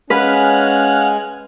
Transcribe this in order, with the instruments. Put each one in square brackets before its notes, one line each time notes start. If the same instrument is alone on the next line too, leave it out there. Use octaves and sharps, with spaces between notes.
[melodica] G#3 G#5 [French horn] C#4 [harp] B4 [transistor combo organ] F5 F#5